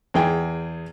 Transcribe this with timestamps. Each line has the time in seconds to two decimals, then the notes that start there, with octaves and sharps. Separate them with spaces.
0.14 E2 G#4 G5